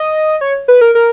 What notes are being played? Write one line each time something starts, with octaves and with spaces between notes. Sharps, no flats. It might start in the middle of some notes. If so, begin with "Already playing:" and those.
Already playing: D#5
C#5
B4
A#4
A#4